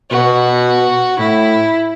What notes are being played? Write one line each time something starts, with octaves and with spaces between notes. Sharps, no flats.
B2 F#4
A2 E4